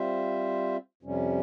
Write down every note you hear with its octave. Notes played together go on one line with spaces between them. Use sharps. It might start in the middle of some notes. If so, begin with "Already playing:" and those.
Already playing: G3 C4 F4 C5 E5
F2 C3 G3 C#4